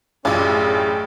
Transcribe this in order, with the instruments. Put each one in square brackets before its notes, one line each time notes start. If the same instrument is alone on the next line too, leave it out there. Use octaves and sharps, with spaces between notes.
[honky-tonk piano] A1 F#2 [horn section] C#4 G4 [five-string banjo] D4 F4 [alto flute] G#4